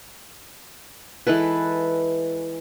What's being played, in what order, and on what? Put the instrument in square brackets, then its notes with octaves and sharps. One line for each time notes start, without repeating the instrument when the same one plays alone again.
[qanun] E3 G#3 A4 B4